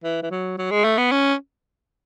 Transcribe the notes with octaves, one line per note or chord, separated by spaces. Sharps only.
E3
E3
F#3
F#3
G#3
A3
B3
C#4